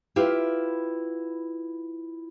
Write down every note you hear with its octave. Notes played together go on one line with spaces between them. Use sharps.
E4 F4 G4 B4 F5